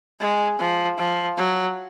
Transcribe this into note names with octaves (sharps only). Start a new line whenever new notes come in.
G#3
F3
F3
F#3